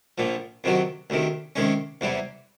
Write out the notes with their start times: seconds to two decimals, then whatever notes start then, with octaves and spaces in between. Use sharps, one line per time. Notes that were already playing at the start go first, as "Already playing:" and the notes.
0.18 A#1 A#2 F3
0.64 F2 C3 D#3 F#3
1.10 D2 C3 D#3
1.56 C3 D#3 G#3 C#4
2.01 E2 C3 E3 G3